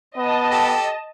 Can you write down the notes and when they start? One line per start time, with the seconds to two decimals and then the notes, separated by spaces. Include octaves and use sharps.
0.17 B3 D#5 A5
0.51 G4 A4